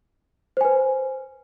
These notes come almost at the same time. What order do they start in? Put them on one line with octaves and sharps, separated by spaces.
C5 G#5 B4